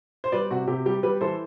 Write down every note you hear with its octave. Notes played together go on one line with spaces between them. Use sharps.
C5
G3 B4 D5
C3 F#4
C3 G4
G3 G4
G3 G4 B4
E3 A4 C5